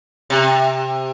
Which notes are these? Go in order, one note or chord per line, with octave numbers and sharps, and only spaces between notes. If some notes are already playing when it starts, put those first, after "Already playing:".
C3